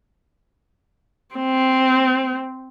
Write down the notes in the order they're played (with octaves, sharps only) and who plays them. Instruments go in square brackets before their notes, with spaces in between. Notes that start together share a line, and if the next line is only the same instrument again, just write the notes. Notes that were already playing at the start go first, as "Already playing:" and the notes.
[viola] C4